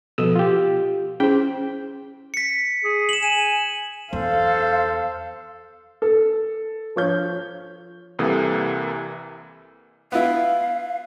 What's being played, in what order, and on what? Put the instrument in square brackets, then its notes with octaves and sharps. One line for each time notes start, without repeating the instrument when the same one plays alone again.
[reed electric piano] B2 D#6 E6 [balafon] F3 A4
[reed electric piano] F4 G4
[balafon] C#4 E4 G#4 [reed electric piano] C5 G5
[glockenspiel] B6 C#7
[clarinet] G#4
[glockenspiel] E7 F#7
[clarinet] G#5 [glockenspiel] E7
[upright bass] E2 [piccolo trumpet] A4 [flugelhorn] C5 [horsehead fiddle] F5
[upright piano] A4
F3 C#5 G6
[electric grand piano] C2 C3 E3 A#3 A4 D#6
[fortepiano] B3 E4 [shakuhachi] F5